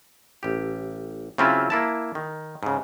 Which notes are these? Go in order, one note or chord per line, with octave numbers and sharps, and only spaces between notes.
A1 G4
C#3 F#3 C4 C#4 E4 F4
A#3 E4 A5
D#3
G#2 C#3